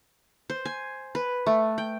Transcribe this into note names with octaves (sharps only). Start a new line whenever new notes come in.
C5
G#5
B4
A3
G5